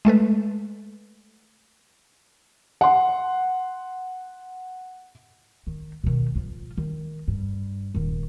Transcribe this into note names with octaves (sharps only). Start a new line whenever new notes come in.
G#3 A3 A4 B4
F#5 C6
D#3
B2 D#3
F3 F4
D#3
G2
D#1 D#3